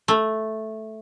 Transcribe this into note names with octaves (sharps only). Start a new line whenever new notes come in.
A3